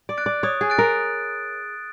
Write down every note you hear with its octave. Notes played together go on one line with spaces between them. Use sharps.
D5
F#6 A6 D7
D5
C#5 D#6
G#4
F#6 A6 D7
A#4